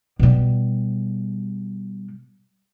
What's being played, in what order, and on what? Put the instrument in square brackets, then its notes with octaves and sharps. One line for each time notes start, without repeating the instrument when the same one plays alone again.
[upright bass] B2 G3